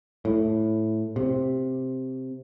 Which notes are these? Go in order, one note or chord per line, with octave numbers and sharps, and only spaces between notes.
A2
C3